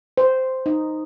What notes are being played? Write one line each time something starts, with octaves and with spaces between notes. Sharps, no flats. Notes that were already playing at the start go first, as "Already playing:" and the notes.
C5
D#4